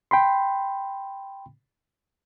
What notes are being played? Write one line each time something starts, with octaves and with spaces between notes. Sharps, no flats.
G5 B5 C6